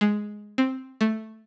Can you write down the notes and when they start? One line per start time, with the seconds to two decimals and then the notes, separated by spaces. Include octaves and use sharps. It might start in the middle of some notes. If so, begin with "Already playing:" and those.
0.01 G#3
0.58 C4
1.01 A3